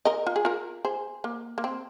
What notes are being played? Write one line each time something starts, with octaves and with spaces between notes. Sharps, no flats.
A#4 D#5
F4
G#4
F4 A#4
G#4 C5
A#3
A#3
C4